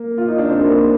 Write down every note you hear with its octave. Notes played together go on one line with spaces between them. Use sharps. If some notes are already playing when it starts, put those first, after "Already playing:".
Already playing: A#3
F4
D#4
D4
C4
A#3